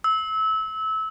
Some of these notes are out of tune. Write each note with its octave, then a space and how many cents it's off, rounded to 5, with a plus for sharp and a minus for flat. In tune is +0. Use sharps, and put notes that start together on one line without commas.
E6 -25